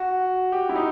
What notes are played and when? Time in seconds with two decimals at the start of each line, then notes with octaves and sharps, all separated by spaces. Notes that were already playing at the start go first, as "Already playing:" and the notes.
Already playing: F#4
0.52 G4
0.69 E4
0.76 D#4